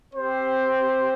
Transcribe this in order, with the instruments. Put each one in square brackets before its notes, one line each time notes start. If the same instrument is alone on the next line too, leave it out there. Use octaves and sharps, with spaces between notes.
[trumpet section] C4 G4 C5